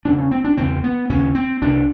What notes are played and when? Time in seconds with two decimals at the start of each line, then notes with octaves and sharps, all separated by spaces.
0.05 E2 C#3 D4
0.19 C#4
0.31 C4
0.44 D4
0.57 E2 C#3 C4
0.84 B3
1.09 D#2 C#3 C#4
1.35 C4
1.62 C2 C3 D4